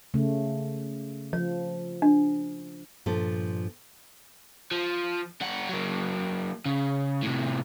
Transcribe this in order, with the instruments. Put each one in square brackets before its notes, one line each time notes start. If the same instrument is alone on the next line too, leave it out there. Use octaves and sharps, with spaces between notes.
[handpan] C#3 A3
[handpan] F3 [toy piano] C#5
[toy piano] D4
[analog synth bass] G2 [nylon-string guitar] A#2 F3 A4
[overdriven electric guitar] F3
G3 F#5
F#3 A#3
C#3
A2 C3